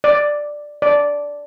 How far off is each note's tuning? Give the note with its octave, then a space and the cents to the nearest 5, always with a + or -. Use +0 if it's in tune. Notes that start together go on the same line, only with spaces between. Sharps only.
D5 +5
D5 -10